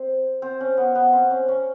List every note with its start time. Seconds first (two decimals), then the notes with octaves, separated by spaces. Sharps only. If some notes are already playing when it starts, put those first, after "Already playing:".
Already playing: C4
0.42 C4
0.61 C#4
0.77 B3
0.95 B3
1.13 C4
1.30 C#4
1.48 C#4